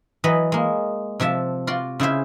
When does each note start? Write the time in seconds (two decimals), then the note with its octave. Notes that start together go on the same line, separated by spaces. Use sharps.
0.24 E3 F#3 B4 D#5
0.52 G#3 A#3
1.20 C3 F3 E5 A5
1.67 F4 F#4 D5 C6
2.00 C#3 E4 F4 C5 E5